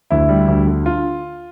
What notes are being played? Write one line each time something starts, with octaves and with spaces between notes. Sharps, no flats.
D2 E4
G3
D2
D3
F4